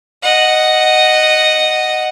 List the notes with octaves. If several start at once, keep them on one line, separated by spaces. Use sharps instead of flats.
D#5 F#5